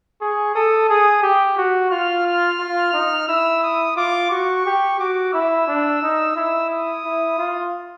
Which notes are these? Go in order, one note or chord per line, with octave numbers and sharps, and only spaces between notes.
G#4 C#6
A4 D#6
G#4 D#6
G4
F#4
F4 F6
F6
F4
D#4
E4 E6
D#6
F4 D6
F#4 C#6
G4
F#4 D6
E4 E6
D4
D#4
E4 E6
D#6
E4
F4